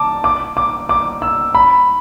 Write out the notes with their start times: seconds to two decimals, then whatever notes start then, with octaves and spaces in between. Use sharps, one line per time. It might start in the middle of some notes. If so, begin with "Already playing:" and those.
Already playing: A5 D6
0.24 D6
0.57 D6
0.89 D6
1.22 E6
1.55 B5